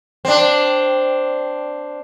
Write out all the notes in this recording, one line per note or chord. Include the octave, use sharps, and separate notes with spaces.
C4 D4